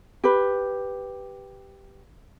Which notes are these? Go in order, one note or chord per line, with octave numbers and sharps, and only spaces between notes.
G4 B4